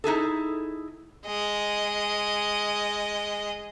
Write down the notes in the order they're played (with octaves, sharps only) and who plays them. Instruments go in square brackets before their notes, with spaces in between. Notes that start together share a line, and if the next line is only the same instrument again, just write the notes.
[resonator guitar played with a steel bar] D#4 E4 G#4 A4
[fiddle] G#3 D#5